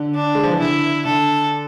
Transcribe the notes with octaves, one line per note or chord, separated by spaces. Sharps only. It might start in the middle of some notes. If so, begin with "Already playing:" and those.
Already playing: D3
D4
G#3
F3
E3
D3 E4
D3 A4